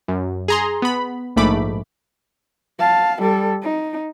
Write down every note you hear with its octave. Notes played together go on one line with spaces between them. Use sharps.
F#2
G#4 A#5 C6
B3 B5
A#1 G#2 A3 B5 D6
F5 A5
G3 A4
D#4